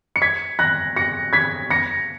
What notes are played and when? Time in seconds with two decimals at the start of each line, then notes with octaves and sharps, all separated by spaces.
0.16 C#7
0.22 G#6 B6
0.59 F#6 A#6
0.96 A#6 C#7
1.33 G#6 B6
1.71 A#6 C#7